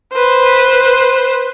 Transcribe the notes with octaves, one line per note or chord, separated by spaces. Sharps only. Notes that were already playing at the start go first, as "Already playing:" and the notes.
B4 C5